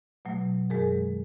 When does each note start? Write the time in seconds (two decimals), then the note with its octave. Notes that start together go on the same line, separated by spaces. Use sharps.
0.25 B2 F#3 A3
0.70 F#2 D#3 G#3 G#4 A#4